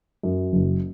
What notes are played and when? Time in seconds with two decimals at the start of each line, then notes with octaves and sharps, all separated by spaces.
0.23 F#2
0.53 F#1